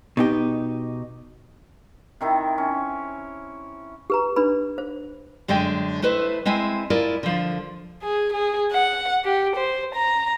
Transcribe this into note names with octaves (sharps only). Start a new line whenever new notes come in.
B2 D#4 G4
C3 D#3 E4
C#4
G4 B4 A#5
D4 B4 B5
C5
F#2 D3 G#3 D#5 G5
A3 E4 B4 C5 D#5
G#3 C4 E4 E5 G#5
E4 F4 A#4 D5 D#5
D3 F3
G#4
G#4
F#5
G4
C5
A#5